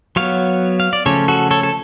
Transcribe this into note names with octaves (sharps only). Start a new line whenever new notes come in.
F#3 B3 C#5 F5
F5
D5
C#3 F3 A3 C#4 A4 C#5
F#4 A4
A4 C#5
A4